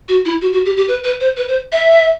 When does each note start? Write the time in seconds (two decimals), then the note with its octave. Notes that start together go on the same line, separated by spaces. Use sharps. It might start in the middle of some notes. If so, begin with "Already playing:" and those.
0.09 F#4
0.25 E4
0.42 F#4
0.53 F#4
0.65 G4
0.77 G4
0.88 B4
1.04 B4
1.21 C5
1.37 B4
1.48 C5
1.72 E5